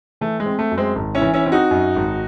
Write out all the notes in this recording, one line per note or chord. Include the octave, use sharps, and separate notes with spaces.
E3 A3
G#3
C4
A3
F#2
G#3 C4
G#1
C#4 E4
E3
C#4 E4
C4 E4
D#4 F#4
F#2
G#1